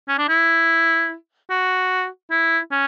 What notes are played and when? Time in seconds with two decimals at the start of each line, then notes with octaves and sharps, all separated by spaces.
0.08 C#4
0.18 D4
0.29 E4
1.50 F#4
2.31 E4
2.72 C#4